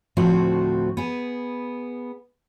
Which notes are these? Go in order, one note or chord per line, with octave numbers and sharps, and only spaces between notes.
D2 A2 F3 C4 F#4
B3 G#4